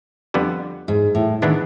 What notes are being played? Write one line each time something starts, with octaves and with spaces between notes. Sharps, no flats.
F2 D3 G3 B3
G#2
A2
D#3 E3 G#3 B3 D4